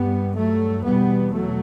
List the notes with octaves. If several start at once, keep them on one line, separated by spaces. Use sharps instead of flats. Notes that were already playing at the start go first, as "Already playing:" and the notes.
Already playing: G2 G3 B3
F#3 A3
E2 B2 G3 B3
F#3 A3